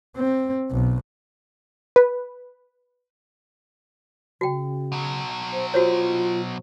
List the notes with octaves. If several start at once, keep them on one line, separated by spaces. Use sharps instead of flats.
C4
B1
B4
C#3 F#4 G5
B2 F#3
C5
F4 F#4 C5 C#5